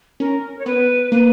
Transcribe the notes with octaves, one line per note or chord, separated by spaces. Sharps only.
C#4 A#4
C#5
B3 B4
A#3 B4